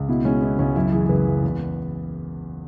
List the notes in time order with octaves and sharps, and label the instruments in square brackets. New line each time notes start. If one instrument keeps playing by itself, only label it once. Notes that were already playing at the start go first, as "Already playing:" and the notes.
Already playing: [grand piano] C#2
B2 E4
G#3 C#4
B3 E4
C#2 C#4
F#2 E4
E3 G#4
G#4
F#1 B4
F#1
E2